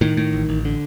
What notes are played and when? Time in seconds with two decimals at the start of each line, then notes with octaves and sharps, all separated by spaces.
0.01 A2 D#3
0.17 A2
0.33 A1
0.49 A1
0.65 D3